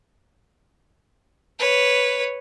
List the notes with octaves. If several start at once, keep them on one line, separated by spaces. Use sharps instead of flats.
B4 C#5